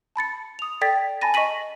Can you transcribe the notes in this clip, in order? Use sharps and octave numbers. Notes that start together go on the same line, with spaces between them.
A5 B5 A6 C#7
D#6 F7
A4 D5 G5 G#6 A6 B6
G#5 A5 B5 A6 A#6 D#7
D#5 C#6 A#6 B6 D#7 F#7